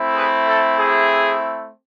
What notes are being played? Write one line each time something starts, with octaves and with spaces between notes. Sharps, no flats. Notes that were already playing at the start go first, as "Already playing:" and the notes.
Already playing: A3 C4 E4
G#4 B4
A4
G#4